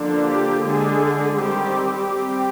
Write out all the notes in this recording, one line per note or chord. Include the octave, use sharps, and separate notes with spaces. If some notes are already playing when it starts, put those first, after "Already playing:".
Already playing: D3 F3 A#3 D4
G4
D3 G#3 D4 G#4
D#3 G3 C4 G4
G3 C4 G4